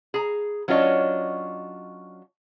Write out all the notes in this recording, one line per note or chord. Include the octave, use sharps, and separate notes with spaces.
G#4 A#5
F#3 C#4 D4 F4 C#5 D#5